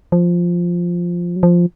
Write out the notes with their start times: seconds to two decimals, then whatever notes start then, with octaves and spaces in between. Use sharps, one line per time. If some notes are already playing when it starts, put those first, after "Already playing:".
0.12 F3
1.36 F#3
1.43 F3